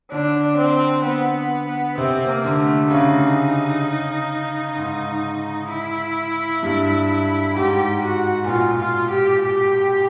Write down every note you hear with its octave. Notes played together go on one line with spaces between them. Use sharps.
D3 D4
C4
B3
B3
B3
C3 C4
A#3
D3
A3
C#3 D#4
G#2
E4
G2
G#2 G4
F#4
A#2
B2 F4
F4
G4
G4